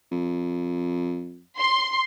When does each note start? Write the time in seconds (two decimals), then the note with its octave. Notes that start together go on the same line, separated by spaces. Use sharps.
0.11 F2
1.57 C6